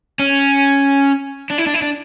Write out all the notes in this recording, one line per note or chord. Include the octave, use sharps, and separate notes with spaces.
C#4
D4
E4
D4
E4
D4